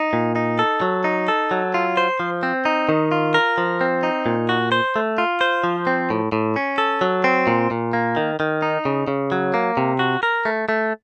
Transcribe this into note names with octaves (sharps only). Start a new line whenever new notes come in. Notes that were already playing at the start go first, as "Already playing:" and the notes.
Already playing: D#4
A#2
D#4
A4
F#3
D#4
A4
F#3
F4
C5
F3
C4
D#4
D#3
F4
A#4
F3
C4
D#4
A#2
F#4
C5
A3
F4
C5
F3
C4
A2
A2
C#4
A4
F#3
C4
A#2
A#2
A#3
D#3
D#3
D#4
C#3
C#3
F#3
A#3
C3
F#4
A#4
A3
A3